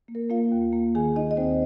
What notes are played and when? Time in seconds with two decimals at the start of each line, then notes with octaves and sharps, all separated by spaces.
0.08 A#3
0.15 A#4
0.30 A#3 F4 F5
0.52 D#2
0.73 A#3
0.95 D#3 G#4 G#5
1.16 D#3 D#4 D#5
1.31 D#5
1.37 D#2 C4 C5